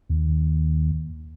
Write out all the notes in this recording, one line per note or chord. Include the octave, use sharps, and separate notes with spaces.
D#2